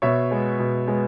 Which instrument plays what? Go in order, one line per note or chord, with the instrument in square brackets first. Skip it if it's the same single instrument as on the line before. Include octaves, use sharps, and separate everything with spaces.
[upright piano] B2 C#5 E5
G#3 B3
B2
G#3 B3